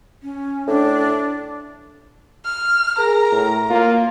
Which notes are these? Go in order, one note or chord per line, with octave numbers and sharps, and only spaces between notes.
C#4
A2 D4
F6
G#4 A#4 A#5
A2
A#3 F4